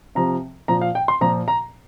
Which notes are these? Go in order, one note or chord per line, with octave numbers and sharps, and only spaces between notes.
C3 F3 A#5
A#2 F3 A#5
F5
G5
C6
A#2 F3 A#5
A#5